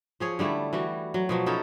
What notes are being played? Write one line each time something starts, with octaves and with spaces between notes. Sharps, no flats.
F3 G#4 C#5
D3 G3 A3 E4
E3 G3 F#4
F#3
B2 F3 F#3
C#4 D#4 E4 A4